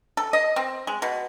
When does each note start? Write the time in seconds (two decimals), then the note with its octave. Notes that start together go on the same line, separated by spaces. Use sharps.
0.17 A4
0.33 D#5
0.56 C4
0.87 G#3
1.02 B2